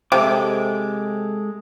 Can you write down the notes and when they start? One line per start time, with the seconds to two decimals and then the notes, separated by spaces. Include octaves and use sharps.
0.12 C3 G#3 A4 D6